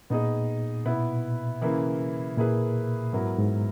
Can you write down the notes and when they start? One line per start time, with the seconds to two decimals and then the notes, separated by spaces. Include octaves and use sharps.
0.10 A#2 B3 D#4 G#4 D#5
0.85 B2 B3 E4 B4
1.62 C#3 E3 A#3 E4
2.37 A#2 A#3 E4 G#4 B4
3.13 G#2 F#3 B3 E4 A#4
3.39 G#2